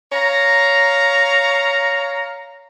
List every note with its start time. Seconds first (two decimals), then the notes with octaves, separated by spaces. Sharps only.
0.12 C#5 F5 A#5